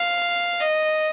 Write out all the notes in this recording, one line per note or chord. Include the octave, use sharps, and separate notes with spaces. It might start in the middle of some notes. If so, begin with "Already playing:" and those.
Already playing: F5
D#5